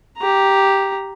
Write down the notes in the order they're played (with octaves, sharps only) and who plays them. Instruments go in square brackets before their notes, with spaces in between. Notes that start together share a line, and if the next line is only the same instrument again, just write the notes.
[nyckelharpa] G4 A#5